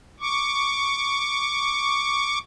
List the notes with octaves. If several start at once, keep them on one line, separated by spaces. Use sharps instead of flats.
C#6 D6